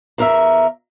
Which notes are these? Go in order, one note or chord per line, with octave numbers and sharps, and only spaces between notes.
E2 A#4 E5